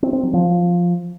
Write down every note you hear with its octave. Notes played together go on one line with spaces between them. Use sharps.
C4
C4
F#3
F3